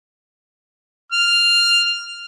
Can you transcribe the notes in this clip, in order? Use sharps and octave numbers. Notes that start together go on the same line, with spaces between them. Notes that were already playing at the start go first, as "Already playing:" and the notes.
F6